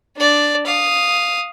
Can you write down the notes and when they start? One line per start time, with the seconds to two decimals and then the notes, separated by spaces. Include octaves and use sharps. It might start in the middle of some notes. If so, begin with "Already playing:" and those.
0.16 D4 D5
0.66 F5 D#6